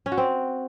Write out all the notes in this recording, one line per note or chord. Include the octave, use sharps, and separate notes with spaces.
C#4
F#4
C4